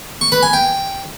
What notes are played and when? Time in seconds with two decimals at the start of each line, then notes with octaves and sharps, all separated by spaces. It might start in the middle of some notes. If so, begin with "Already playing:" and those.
0.21 C#6
0.32 B4
0.43 G#5
0.53 G5